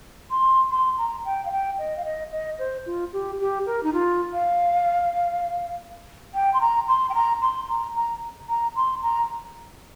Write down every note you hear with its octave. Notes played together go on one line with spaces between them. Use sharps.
C6
C6
A#5
G5
F5
G5
D#5
F5
D#5
D#5
C5
F4
G4
G4
A#4
D#4
F4
F5
G5
C6
A#5
C6
G5
A#5
C6
A#5
A#5
A#5
C6
A#5